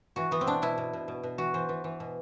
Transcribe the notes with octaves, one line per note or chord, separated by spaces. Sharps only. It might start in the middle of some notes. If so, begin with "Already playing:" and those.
E3 F#4
E3 B3
C4
B2 D4
B2 E4
B2
B2
B2
B2
E3 F#4
E3 C5
E3
E3
B2